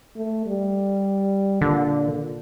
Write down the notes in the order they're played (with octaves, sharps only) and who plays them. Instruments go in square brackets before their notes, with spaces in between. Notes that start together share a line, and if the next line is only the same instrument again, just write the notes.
[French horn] A3
G3
[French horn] A#2 [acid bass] D3